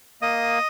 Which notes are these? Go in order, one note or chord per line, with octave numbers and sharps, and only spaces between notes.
A#3 D#5 D#6